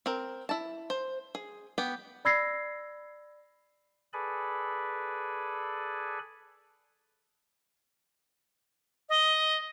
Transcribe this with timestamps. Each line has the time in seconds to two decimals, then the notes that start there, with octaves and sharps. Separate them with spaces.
0.06 C4 A#4
0.49 E4 A5
0.90 C5
1.35 G#4
1.78 B3 G4
2.25 D5 B5 E6 G#6 A#6 C7
4.13 G#4 A4 B4 D5 G#5 B5
9.09 D#5